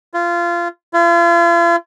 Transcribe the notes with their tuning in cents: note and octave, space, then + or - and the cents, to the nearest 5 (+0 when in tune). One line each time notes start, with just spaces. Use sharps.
F4 -20
F4 -40